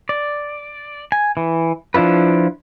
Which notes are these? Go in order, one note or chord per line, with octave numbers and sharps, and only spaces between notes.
D5
G#5
E3
F3 D4 E4 F4 B4